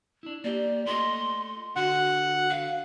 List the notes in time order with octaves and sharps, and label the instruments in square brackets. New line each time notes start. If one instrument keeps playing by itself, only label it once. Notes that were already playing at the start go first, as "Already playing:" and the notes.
[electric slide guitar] D4 E4
[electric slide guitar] A#3 G4 [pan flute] D5
[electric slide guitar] A3 F4 D#5 [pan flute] C6
[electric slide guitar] D3 [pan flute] F#4 [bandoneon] F#5
[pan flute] F5